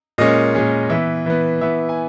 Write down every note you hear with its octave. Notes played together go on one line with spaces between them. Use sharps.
A#2 G#3 C#4 D#5
A#2 G#3 C#4
E3 B3 E5
E3 B3
E3 B3 E5
G#5